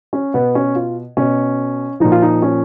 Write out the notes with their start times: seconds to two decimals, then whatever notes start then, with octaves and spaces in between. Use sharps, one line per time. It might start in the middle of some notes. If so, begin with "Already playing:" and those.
0.13 C#4
0.34 B2 B3
0.55 C#4
0.75 F4
1.17 B2 C#4
2.00 A#2 F3 D#4
2.12 F4
2.22 D#4
2.42 C#4